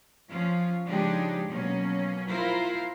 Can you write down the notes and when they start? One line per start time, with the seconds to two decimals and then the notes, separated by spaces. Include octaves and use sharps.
0.29 F3 C#4 F4
0.86 C#3 F3 G#3 D4 D#4 G4
1.47 B2 F#3 A#3 C#4
2.28 E4 F4 A#4 C5